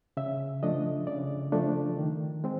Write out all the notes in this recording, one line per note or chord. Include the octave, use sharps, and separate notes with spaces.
C#3 E5
F3 A3 D4 D#5
C#3 D5
F3 A3 D4
D#3
G#3 C4